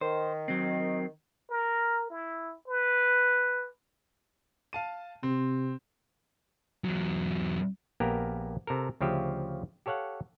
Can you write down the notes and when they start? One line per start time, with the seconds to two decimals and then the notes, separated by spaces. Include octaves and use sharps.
0.01 D#3 C5
0.48 F#3 C4
1.50 A#4
2.10 E4
2.68 B4
4.73 F5 A5 D#7
5.23 C3 C4
6.84 E2 F#3
8.00 A#1 A#3 B3 G4 A#4
8.67 C3 A4 A#4
9.01 D2 C#3 F3 G4 E5
9.86 G4 A4 C#5 F5 F#5